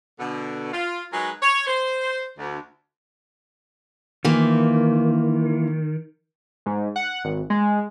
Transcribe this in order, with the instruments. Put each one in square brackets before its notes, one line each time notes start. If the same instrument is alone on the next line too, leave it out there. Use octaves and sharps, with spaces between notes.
[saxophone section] B2 D3
F4
F#3 G#3 D#4 G#4 A#4 B4
C#5
C5
D2
[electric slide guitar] D#3 [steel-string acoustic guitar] E3 A#3 F4
[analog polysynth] G#2
F#5
G#1
G#3